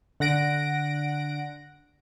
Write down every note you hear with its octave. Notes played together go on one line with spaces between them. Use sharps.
D3 F#5 A#6 D7